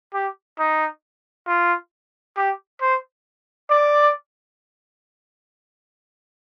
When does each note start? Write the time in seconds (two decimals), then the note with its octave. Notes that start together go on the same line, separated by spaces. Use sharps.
0.14 G4
0.59 D#4
1.47 F4
2.37 G4
2.81 C5
3.70 D5